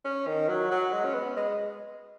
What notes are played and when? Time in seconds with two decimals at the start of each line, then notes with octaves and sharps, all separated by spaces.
0.05 C#4
0.27 D#3
0.49 F#3
0.71 F#3
0.93 G#3
1.05 C#4
1.15 B3
1.37 G#3